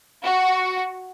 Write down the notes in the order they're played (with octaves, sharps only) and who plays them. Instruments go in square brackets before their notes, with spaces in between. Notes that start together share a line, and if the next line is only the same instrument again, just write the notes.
[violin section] F#4